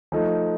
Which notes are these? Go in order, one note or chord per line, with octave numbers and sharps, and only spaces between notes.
F3 A3 D#4